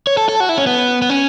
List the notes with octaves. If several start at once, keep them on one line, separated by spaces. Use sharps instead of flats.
C#5
A4
A4
F#4
E4
C#4
B3
B3
C#4